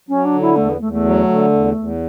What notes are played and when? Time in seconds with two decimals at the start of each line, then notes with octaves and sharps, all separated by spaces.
0.08 F#3 C#4
0.24 D4
0.32 D3
0.41 E4
0.56 E2 A3
0.69 B3
0.80 E2 A3
0.92 A3
1.04 F#3
1.29 D3
1.52 E2
1.77 E2